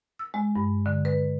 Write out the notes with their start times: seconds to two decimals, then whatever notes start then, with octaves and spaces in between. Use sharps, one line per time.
0.19 E6
0.34 G#3
0.56 G2
0.86 D3
1.05 B4